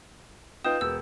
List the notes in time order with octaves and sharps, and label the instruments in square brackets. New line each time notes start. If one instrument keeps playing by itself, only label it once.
[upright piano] D#4 F4 G5 [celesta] B4 G6 E7 [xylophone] D#6
[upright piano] E1 [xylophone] E6